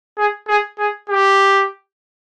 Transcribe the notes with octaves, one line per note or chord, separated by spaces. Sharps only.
G#4
G#4
G#4
G4